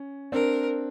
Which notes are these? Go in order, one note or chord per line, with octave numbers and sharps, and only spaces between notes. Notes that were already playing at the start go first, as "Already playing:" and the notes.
Already playing: C#4
C4 D4 A#4